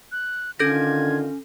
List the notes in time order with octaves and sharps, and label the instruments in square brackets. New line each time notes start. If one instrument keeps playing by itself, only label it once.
[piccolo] F#6
[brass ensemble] D3 D#3 F4 [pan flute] C#4 [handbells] A4 G6 A#6 [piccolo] G#6